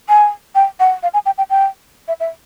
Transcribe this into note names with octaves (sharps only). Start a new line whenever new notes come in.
G#5
G5
F#5
F5
G#5
G5
G5
G5
E5
E5